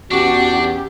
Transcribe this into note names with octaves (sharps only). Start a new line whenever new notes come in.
E2 C#4 D4 F#4 G4 F#5 D6